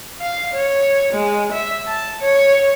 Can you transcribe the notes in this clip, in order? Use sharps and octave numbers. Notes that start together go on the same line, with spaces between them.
F5
C#5
G#3
E5
A5
C#5